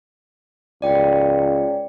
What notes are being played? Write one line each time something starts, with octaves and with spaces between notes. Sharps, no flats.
C#2 D5 G5